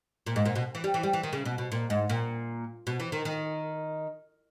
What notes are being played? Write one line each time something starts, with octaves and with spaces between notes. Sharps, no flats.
A#2
G#2
A#2
B2
E3
G3
E3
G3
E3
D#3
C#3
B2
B2
A#2
G#2
A#2
B2
E3
D#3
D#3